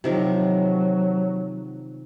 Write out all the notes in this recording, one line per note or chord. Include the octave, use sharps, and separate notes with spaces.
C3 D#3 F3 F#3